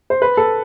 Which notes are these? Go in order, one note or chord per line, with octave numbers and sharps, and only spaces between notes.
C5
B4
A4